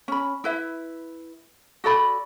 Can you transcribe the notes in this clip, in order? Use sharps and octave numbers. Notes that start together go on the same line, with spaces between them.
C#4 B5
E4 B4 E5
F#4 A4 D5 B5